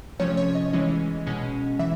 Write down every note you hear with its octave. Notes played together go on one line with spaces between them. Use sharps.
C3 F3 A3 C#4 C#5
C#5
D#5
E3 G#3 C#4
B2 G#3 C#4
E3 E5